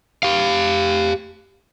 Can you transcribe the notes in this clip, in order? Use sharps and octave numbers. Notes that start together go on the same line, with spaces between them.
G4 F5